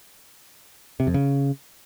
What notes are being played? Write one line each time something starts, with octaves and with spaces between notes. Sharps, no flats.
C3
F2
C#3